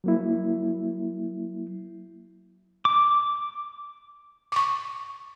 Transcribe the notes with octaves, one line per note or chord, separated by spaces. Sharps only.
F#3 A#3 E4
D6
C#6 D6